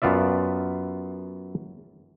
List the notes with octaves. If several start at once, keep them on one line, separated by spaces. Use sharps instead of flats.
F#2 B3 F4 D5 E5